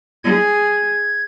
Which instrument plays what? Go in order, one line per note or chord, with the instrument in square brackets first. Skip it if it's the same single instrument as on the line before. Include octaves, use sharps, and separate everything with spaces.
[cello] G#4 [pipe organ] G#6